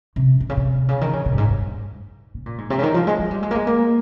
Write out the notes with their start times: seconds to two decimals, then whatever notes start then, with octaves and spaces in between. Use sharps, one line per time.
0.16 C3
0.40 C3
0.49 C#3
0.57 C3
0.89 C#3
1.01 D#3
1.13 C#3
1.26 C3
1.32 G2
1.38 G#2
1.50 G2
1.62 G2
2.34 C#3
2.46 A#2
2.58 G#2
2.70 C3
2.79 C#3
2.83 D#3
2.94 F3
3.07 G#3
3.19 G#3
3.31 G3
3.43 G#3
3.51 A#3
3.55 G#3
3.67 A#3